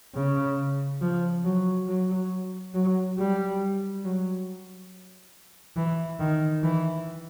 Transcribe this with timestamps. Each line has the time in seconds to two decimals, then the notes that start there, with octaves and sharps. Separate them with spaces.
0.15 C#3
1.01 F3
1.44 F#3
1.87 F#3
2.74 F#3
3.18 G3
4.04 F#3
5.76 E3
6.19 D#3
6.63 E3